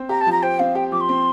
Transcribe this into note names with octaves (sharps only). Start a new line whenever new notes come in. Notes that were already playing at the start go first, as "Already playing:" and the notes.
Already playing: C4 C5
G4 A#5
A5
F3
A#5
C5 G5
C4 F5
G4 G5
F3 D6
C6
C4